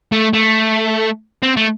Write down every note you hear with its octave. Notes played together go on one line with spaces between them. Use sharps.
A3
A3
C4
A3